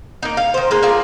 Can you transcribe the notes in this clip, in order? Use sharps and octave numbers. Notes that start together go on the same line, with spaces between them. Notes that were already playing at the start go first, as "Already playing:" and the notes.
A#3 D#4
F5
D#3 C5
G#3 A#3
A#3 D4 F4 G#4